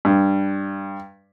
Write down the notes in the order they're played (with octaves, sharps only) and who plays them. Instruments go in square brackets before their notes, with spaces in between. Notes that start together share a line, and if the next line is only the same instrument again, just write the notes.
[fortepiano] G2